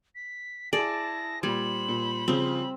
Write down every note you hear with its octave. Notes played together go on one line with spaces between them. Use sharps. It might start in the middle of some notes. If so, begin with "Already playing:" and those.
B6
E4 G#4 D5 A5 A#6
A#2 G3 C5 B5 G#6 F#7
A#2
C#3 F3 C4